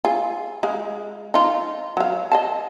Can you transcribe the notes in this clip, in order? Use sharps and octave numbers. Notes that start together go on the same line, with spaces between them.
F4 G#4
G#3 G#4 F5
D#4 F4
F#3 F5
D#5 F5 A5